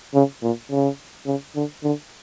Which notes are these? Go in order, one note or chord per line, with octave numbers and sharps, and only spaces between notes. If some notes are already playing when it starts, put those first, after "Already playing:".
C#3
A#2
C#3
C#3
D3
D3